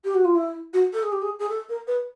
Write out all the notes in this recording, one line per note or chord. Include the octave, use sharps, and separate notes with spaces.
G4
F#4
F4
E4
F#4
A4
G#4
G4
G#4
G#4
A4
A#4
B4